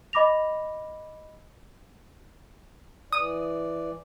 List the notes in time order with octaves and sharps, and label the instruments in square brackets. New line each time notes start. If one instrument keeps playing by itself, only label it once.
[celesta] D#5 B5 D6 A#6 F7
[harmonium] E3 D5 [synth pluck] D#6